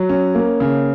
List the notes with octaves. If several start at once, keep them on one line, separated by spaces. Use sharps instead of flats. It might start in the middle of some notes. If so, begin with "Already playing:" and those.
Already playing: F#3
C#4
A#3
C#3